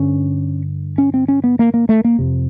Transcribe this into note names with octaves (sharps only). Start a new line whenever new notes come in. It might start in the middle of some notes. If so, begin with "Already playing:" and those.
Already playing: G2 D3 C#4
C#4
C4
C#4
B3
A#3
A#3
A3
A#3
F2 C3